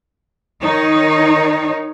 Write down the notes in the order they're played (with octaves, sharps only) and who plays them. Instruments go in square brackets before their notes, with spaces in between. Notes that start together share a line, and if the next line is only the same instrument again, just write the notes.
[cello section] D#3 D#4 C#5